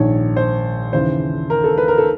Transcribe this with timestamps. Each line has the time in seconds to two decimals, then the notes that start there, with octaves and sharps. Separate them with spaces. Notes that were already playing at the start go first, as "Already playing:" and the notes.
Already playing: A#1 G#2 D#3 C#5
0.36 C5
0.93 D#2 C#3 E3 C5
1.50 A#4
1.64 A4
1.78 B4
1.88 A#4
1.98 A4